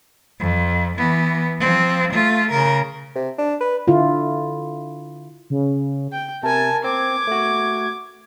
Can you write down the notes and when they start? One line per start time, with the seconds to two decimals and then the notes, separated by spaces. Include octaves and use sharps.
0.39 F2
0.97 E3 B3
1.60 F3 C4
2.12 A3 F4
2.52 C#3 A#4
3.15 C3
3.38 D4
3.61 B4
3.88 D3 E4 F4
5.50 C#3
6.12 G5
6.43 C3 A#4 G#5 A5
6.84 C4 D6 G#6
7.27 A3 F#4